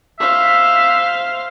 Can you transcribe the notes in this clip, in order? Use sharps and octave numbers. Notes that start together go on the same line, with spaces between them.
C5 E5 F5